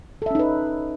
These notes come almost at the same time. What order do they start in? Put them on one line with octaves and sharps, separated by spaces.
A4 E5 C#4 D#4 B4